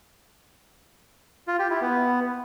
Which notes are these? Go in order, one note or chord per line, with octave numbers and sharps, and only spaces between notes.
F4
G4
E4
B3